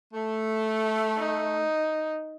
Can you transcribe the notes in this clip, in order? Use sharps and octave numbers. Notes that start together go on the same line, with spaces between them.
A3
D#4